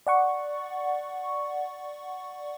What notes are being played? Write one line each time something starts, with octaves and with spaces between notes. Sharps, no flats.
D5 F#5 C#6